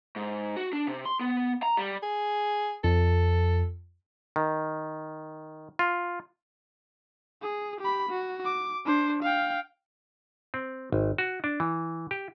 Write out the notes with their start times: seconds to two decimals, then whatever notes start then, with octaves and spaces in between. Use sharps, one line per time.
0.16 G#2
0.57 F#4
0.73 D4
0.87 C3
1.06 C6
1.20 B3
1.63 A#5
1.77 G3
2.03 G#4
2.84 F2 A4
4.36 D#3
5.79 F4
7.42 G#4
7.80 G4 B5
8.09 F#4
8.45 D6
8.85 D4 C5
9.23 F5 G5
10.54 C4
10.92 G#1
11.18 F#4
11.44 D4
11.60 E3
12.11 G4